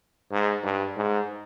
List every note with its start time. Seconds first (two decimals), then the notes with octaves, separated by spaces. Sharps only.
0.31 G#2
0.64 G2
0.96 G#2